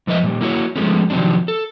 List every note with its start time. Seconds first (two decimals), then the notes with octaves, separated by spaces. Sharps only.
0.07 F2 F3 B4 D#5 E5
0.23 A#2 G3
0.41 A#3 E4 F#4 C#5
0.76 F3 G#3 A3 B3 C#4
1.10 C3 D#3 F3 F#3 C4 D4
1.48 A4